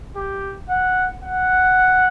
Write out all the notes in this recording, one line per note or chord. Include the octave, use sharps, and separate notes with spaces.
G4
F#5
F#5